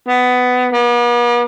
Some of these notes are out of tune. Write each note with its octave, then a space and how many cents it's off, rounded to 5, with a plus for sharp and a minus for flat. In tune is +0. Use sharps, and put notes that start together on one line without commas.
B3 +15
B3 -45